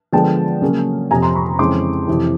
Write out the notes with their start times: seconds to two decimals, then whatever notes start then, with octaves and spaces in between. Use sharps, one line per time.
0.13 D3 F3 G#3 B3 G5 A5
0.62 C#3 F#3 A#3 C#4
1.10 F2 C3 F3 G#5 A#5
1.23 A#5 C6
1.35 B5 C#6
1.59 F2 C#3 E3 G#3 C4 C6 D6
2.08 F2 C3 E3